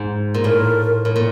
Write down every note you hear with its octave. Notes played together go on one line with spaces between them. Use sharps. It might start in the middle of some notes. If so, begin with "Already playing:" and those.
Already playing: G#2
A#2
A2 A#4
A2
A#2